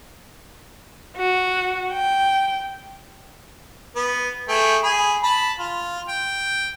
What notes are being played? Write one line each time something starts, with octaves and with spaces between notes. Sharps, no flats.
F#4
G5
B3
A3 G#4 G5
G#4 B5
A5 B5
F4
G5